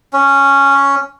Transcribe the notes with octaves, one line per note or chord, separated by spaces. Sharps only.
C#4